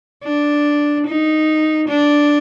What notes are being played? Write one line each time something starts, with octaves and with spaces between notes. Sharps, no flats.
D4
D#4
D4